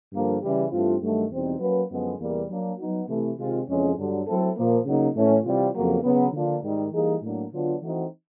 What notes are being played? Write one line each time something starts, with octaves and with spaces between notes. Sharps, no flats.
G2 D3 F3 A#3
C#3 E3 G3
G2 E3 A3 C4 F4
G2 D#3 F#3 A3
E2 B2 G3 C4 D#4
F#3 A#3 C#4 F#4 B4
F#2 D3 F3 G#3 B3
E2 C3 E3 G3 A#3
F#3 A#3 D4
F#3 B3 D#4 F#4
C3 E3 A3
C3 D#3 G#3 C4 F4
F2 C#3 E3 G#3 C#4
G2 D3 F#3
F#3 A3 C4 E4 A4
A#2 F3 A#3
C#3 F#3 A#3 D#4
A2 E3 A3 C#4
C3 E3 G3 C4 F4
F2 C#3 F#3 A#3
C#3 F#3 B3
D3 F3 A#3 D4 F4
G#2 D#3 G3
E3 G3 A#3 D#4 G#4
A2 F#3 A#3 D4
D3 F#3 B3 D4 F4
E3 A3 C4 D#4 F#4